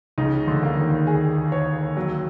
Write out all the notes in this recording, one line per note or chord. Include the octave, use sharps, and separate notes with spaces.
C#2 C#3 D#4
D2 D3
A#3
D#2 D#3
G#4
C#5
F#3